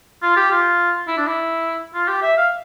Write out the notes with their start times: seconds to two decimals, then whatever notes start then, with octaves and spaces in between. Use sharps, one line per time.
0.22 F4
0.36 G4
0.51 F4
1.08 E4
1.17 D4
1.27 E4
1.94 F4
2.08 G4
2.22 E5
2.37 F5